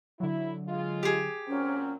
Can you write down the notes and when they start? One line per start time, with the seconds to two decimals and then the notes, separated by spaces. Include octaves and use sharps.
0.20 D3 F#3 E4
0.67 G#3 F4
1.03 G4 G#4
1.48 A#2 F#3 C4 C#4